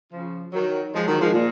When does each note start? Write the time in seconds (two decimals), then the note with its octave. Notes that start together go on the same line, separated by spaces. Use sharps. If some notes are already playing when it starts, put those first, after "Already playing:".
0.13 C#3 F3
0.53 D#3 F#3
0.94 F3 G#3
1.07 D#3 F#3
1.21 F3 G#3
1.34 A#2